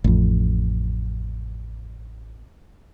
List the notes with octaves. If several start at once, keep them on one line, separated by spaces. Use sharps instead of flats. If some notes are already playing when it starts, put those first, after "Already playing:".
A1 F2